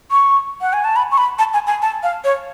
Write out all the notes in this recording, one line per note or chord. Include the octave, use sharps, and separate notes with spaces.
C#6
F#5
G#5
A5
B5
C#6
B5
A5
G#5
G#5
A5
F5
C#5